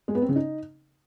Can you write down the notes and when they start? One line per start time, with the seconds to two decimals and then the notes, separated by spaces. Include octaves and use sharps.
0.08 G#3
0.15 B3
0.22 C4
0.29 C#3
0.35 D#4